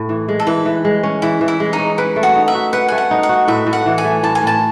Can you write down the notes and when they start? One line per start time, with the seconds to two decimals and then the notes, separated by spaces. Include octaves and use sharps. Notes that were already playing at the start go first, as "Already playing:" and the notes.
Already playing: A2
0.09 E3
0.28 G#3
0.40 A4
0.47 E3 B4
0.66 E3
0.85 G#3
1.03 C#4
1.22 E3 E4
1.41 E3
1.48 E4
1.60 G#3
1.73 D#4
1.79 C#4
1.98 E4 B4
2.16 A3
2.23 F#4
2.35 D#4
2.48 E5
2.55 F#4
2.73 B4 F#5
2.88 A3 G#5
2.98 F#5
3.11 D#4
3.23 F#5
3.29 F#4
3.48 A2 E5
3.67 A2
3.73 F#5
3.86 E3
3.98 G#5
4.04 A3
4.23 A2 A5
4.35 G#5
4.42 A2 A5